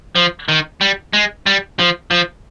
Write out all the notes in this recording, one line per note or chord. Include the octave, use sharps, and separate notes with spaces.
F3
D#3
G3
G#3
G3
F3
F3